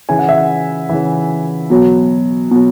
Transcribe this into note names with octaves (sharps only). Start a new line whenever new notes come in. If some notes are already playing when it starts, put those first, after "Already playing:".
C#3 E3 G#5
F#5
E5
F#5
C#3 E3
B2 F#3
B2 F#3